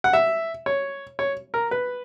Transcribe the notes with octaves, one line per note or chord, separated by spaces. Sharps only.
F#5
E5
C#5
C#5
A#4
B4